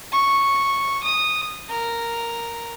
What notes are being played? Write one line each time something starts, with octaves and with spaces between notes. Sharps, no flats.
C#6
D#6
A#4